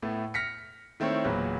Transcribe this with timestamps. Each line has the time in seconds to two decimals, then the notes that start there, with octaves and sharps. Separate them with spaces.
0.02 A2 A3 B3
0.34 F6 A#6 B6 C#7
1.00 D#3 A3 C4 E4 C#5
1.25 E1 A#2 F#3 B3